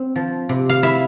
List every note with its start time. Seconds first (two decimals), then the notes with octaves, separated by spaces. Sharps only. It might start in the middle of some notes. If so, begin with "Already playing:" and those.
Already playing: C4
0.16 F3
0.49 C3
0.69 F5
0.83 E4 E5